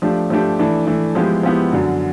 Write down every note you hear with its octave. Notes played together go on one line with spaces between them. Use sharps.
F3 A3 D4 G4
F3 A3 D4 G4
E3 A3 D4
E3 A3 D4
F3 G#3 B3 E4 G4
F3 G#3 B3 E4 G4
F#2 D3 F#3